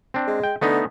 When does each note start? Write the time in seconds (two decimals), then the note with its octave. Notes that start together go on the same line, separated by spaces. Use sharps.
0.14 C4 D4
0.27 G#3
0.44 G5
0.61 D3 A3 B3 D#4